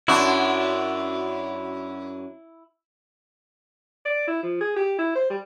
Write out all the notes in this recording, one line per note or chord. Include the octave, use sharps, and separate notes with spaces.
F#2 D4 E4 F#4
D5
E4
F3
G#4
G4
E4
C5
G3